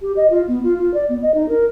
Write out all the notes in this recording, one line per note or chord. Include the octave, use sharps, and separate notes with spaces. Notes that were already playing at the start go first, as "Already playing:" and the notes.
G4
D#5
F4
B3
F4
F4
D5
B3
D#5
D#4
A#4